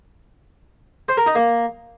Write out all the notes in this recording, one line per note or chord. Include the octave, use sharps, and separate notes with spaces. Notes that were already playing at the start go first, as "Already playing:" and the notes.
C5
A#4
D#4
A#3